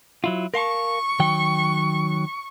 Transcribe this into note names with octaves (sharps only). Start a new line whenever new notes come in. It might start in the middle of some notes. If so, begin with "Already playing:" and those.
F#3 E4 F4
A#4 F5 A5 C#6
D#3 F#3 G5